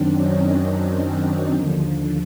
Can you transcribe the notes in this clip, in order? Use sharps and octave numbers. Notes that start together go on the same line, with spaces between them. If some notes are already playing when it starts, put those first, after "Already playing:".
Already playing: F#2 D#3 F#3 C4 D4
C#4 D#4
C4 D4
C#4
D#2 D3 F3